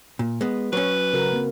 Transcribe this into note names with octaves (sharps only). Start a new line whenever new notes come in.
A#2
G#3 B3
F#3 C#4 B4
C#3 F#4 A#4
A#3 C4